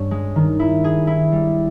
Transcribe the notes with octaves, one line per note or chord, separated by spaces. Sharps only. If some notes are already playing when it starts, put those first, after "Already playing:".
Already playing: G2 C#4
G#3
D#3
E4
G#4
E4
G3